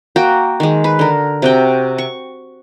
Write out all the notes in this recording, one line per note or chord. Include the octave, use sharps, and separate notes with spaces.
A#3 F#4 G5
D#3 G#3
B4
D3 A#4
C3 F#4 G5
C#6